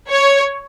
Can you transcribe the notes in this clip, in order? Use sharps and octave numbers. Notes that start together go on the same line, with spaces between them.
C#5